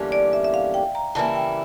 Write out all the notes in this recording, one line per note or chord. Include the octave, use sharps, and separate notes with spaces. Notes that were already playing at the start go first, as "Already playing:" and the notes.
Already playing: E2 D3 G3 A#3 C#4
D5
E5
E5
F5
G5
A#5
C#3 E3 G3 A#3 E4 A5
G5